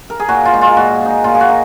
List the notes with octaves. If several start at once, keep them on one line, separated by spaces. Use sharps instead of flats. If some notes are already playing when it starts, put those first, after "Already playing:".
A#4
G#4
A#2 F#4
F4
G#3 D#4
F4
A#2 F#4
G#3 D#4
A#2 F4
G#4
F#4
D#4